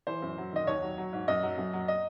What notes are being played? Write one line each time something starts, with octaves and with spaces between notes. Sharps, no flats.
E3 C5
F#2
F#3
D#3 D#5
D#2 C#5
F#3
F#3
G#2
F#2 D#5
F#3
F#2
F#3
D#5